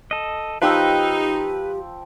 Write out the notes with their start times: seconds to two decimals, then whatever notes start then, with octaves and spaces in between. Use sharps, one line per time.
0.11 A4 D#5
0.62 F3 D#4 G4 B4 G5 E6